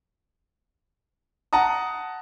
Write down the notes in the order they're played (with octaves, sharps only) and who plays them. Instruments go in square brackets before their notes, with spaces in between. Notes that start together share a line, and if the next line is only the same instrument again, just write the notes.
[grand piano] F#5 A5 A#5 D#6